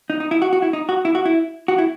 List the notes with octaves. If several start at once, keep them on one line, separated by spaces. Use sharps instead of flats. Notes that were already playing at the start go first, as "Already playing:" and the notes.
D#4
D#4
E4
F#4
F#4
E4
D#4
F#4
E4
F#4
E4
F#4
E4